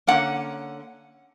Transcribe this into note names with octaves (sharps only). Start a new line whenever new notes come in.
D3 A#3 C#4 F#5